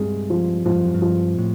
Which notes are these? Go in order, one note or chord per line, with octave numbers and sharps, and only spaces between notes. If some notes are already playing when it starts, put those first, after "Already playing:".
Already playing: C2 G2 G#3
F3
G#2 F3
G2
F#2
G2
F3
A2